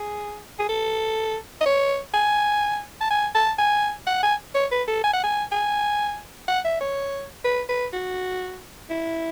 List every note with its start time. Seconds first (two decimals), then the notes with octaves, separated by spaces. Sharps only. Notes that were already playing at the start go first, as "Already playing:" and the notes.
Already playing: G#4
0.59 G#4
0.69 A4
1.61 D#5
1.66 C#5
2.14 G#5
3.01 A5
3.11 G#5
3.35 A5
3.59 G#5
4.07 F#5
4.23 G#5
4.55 C#5
4.71 B4
4.88 A4
5.04 G#5
5.14 F#5
5.24 G#5
5.52 G#5
6.48 F#5
6.65 E5
6.81 C#5
7.45 B4
7.69 B4
7.93 F#4
8.90 E4